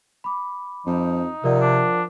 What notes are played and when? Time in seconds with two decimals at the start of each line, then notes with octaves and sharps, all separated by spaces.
0.24 B5 D6
0.86 F2 F3 D#4
1.44 C3 F3 A#4 D5 F#5
1.61 D4